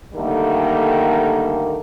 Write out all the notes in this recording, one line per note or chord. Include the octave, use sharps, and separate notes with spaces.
D3 D#3 G3 A3 A#3